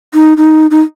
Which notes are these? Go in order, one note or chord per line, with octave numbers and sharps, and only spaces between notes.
D#4
D#4
D#4